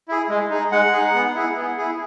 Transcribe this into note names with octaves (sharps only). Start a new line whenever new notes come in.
E4 G#4
G#3
D#4 G#4
G#3 F#5
D#4 G#4
B3
E4 G#4
B3
E4 G#4